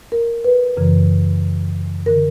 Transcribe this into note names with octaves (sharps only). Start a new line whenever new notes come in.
A#4
B4
F#2 C#3 E3
D3 A#4